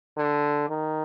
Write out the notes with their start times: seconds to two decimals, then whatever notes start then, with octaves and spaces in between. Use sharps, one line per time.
0.17 D3
0.69 D#3